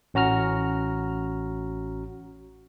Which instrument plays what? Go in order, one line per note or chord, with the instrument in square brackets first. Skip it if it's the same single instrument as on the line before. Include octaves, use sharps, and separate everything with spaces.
[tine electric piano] A1 C#4 F#4 A#5 F6